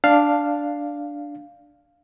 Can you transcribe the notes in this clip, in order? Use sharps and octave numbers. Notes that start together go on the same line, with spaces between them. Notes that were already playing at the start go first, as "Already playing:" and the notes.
D4 F5